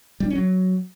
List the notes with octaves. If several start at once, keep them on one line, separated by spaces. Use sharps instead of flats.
G3
D4
C#4
F#3